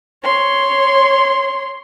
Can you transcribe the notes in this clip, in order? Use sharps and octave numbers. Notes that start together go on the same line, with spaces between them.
C#5 C6